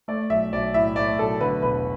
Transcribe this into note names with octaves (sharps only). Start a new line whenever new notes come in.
A3 D5
B1 E5
B1 D5
A2 E5
A3 D5
B1 A4
D3 B4
E1 B4